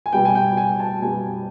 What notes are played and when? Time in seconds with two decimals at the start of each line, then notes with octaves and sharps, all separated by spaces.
0.06 G#5
0.13 B2 G3 B3 G5
0.25 G#5
0.35 G5
0.57 G#5
0.80 A5
1.02 B2 G3 B3 G#5